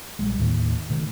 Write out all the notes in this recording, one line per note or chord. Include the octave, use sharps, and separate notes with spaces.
A#1 G3 G#3
D#2 A2 D#3 A#3
B2 D#3 A3